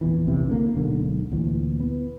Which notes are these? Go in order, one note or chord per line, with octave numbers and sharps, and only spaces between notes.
A#1 E2 E3
A#1 E2 C3 E3
D3 A3 A#3
D1 B1 G#2 D3
D2 A#2 E3
B3